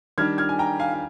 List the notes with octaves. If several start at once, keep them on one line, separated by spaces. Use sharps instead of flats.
D#3 G3 D4 F6 G#6
F6 G#6
G#5
G5 A#5
F5 G#5
F5